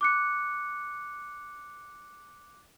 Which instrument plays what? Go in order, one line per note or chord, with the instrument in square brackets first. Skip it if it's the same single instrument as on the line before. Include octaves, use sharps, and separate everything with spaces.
[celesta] D6 F#6 C#7